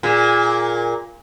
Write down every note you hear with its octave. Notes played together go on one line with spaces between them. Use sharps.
A#2 G#4